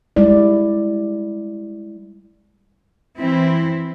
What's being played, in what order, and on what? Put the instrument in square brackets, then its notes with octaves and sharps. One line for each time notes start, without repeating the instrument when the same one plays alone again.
[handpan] G3 G#3 E4 D5
[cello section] E3 C4 E4